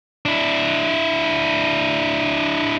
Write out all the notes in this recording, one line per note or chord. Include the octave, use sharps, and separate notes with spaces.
D4 E4